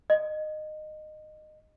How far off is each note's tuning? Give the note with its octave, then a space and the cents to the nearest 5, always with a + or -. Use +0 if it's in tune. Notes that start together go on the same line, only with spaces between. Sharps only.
D#5 -20